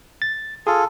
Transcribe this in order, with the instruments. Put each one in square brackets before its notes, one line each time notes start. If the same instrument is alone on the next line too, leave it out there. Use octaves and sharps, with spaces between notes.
[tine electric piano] A6
[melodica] F4 A4 [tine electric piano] G#4